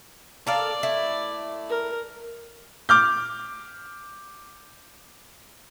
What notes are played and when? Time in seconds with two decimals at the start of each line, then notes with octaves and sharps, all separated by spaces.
0.47 A4 A#4 D5 F5
0.83 A3 E4
1.69 A#4
2.89 D6 F6 G6